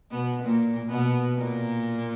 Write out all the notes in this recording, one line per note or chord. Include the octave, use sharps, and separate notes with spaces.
B2 B3
A#2 A#3
B2 B3
A#2 A#3